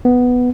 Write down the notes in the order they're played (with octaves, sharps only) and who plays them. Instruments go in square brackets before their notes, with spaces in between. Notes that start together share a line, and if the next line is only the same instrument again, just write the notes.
[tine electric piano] B3